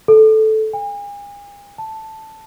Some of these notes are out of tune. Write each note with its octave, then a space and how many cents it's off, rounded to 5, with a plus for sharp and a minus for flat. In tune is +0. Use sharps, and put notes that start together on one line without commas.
A4 -10
G#5 -40
A5 +0